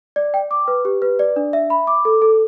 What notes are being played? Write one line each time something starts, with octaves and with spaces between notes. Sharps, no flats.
D5
G5
D6
B4
G4
B4
D5
D4
E5
B5
D6
A4
A4